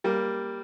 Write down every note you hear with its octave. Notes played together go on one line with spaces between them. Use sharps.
G3 A#3